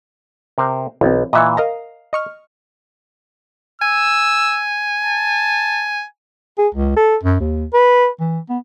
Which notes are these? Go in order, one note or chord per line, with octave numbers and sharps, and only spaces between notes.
C3 A#4 C5
B1 E3 F#3 C4
A#2 E3 D#5 E5 C#6
A#4 D#5 F5 A#5
D#5 C#6 F6
G#5 E6
A5
G#4
C#2
A4
F#2
D#2
B4
E3
B3